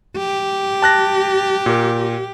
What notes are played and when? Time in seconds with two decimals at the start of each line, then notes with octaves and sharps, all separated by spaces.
0.17 G4
0.82 A5 F#6 A#6
1.66 A#2 A#4